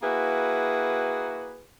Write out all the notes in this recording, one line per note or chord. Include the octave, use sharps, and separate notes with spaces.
A#3 E4 F#4 G#4 B4